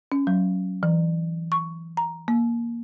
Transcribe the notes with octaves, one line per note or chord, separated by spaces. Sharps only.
C#4
F#3
E3
C#6
A#5
A#3